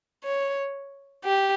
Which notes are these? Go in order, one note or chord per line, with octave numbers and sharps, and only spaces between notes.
C#5
G4